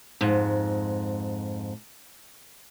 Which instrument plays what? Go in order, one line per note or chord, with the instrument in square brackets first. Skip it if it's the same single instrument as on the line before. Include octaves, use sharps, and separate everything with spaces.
[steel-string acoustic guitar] F2 G#2